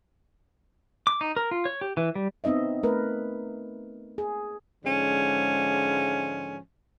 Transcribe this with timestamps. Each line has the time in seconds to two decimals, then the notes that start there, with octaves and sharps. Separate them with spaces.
1.07 D6
1.21 D#4
1.37 A#4
1.51 F4
1.65 C#5
1.81 G4
1.97 E3
2.15 G3
2.44 B3 C4 D#4 D#5 E5
2.83 A3 A#4 B4
4.18 G#4
4.85 G#2 D3 F3 G#3 C#4